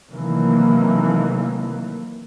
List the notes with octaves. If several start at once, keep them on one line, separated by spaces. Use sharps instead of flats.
C3 D#3 E3 F#3 A3 A#3